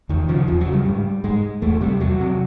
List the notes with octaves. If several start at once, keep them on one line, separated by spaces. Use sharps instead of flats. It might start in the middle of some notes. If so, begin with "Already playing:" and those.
E2 D#3
C#3 F3
E2 F3
F#3
C#3
G3
G#2
G#2 G#3
E2 A3
C3 G3
E2 F#3
C3